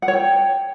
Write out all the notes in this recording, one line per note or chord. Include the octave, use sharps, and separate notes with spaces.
F#5
C#5
G5